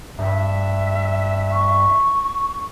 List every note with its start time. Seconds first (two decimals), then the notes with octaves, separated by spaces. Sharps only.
0.19 G2 E5
1.52 C#6